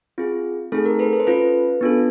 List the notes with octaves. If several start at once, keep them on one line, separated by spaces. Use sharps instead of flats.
C4 F4 G#4
A3 C4 D#4 G#4 A4
A#4
A4 B4
A4
C5
C#4 F4 A4 B4
B3 D4 F4 A4